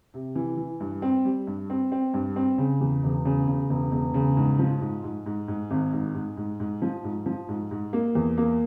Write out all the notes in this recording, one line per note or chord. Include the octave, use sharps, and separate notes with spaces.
C3
E3
E3
G2
C4
G3
G2
C4
C4
G2
C4
C#3
E2
E1
C#3
C#3
E1
E1
C#3
G#2
F3
G#2
G#2
G#2
G#2
G#1
G#2
G#2
G#2
G#2
F3
G#2
F3
G#2
G#2
A#3
E2
A#3